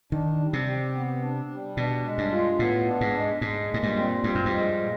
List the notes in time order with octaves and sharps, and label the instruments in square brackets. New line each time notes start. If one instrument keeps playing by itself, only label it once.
[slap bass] D#3 [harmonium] D4
[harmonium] G3
[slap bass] C3
[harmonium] G4
B3
D4
G3
[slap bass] B2 [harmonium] D4
[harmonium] G#3
[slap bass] G2
[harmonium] F4
[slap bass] A2 [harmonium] B3
[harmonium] D4
[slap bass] G#2
[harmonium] G#3
[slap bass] G#2 [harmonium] G#3
[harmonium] A#2
[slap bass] G#2
G2
[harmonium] C4
[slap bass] G2 [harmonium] F3
[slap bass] F#2
G2
[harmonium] G#3
A#2